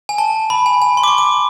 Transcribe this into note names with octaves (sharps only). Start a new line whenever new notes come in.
G#5
A5
B5
G#5
G#5
C6
D6
C#6
D6